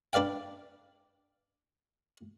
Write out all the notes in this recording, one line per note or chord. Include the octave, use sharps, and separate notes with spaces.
D4 B4 D5 F5 G5